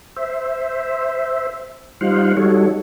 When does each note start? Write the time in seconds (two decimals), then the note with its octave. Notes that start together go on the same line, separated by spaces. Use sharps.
0.16 C5 E5
2.01 G3 D#4 F4 C5 F5 F#5
2.37 G3 D#4 F#4 A4 C#5